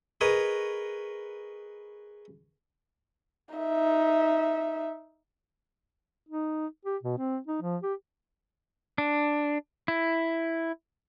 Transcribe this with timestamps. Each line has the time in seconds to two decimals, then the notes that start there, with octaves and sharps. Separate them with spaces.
0.21 G#4 A#4 B4 C#5 D#5
3.55 D#4 E5
6.29 D#4
6.85 G4
7.03 B2
7.18 C4
7.47 D#4
7.62 F3
7.83 G4
8.98 D4
9.88 E4